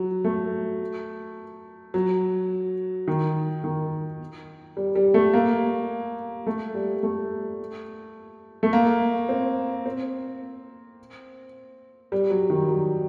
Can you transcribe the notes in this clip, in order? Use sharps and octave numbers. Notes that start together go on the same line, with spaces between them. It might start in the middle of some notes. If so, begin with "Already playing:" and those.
Already playing: F#3
A3
F#3
D#3
D#3
G3
G3
A3
A#3
A3
G3
A3
A3
A#3
C4
C4
G3
F#3
D#3
F#3